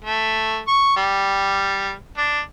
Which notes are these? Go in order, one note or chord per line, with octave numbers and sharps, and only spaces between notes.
A3
C#6
G3
D4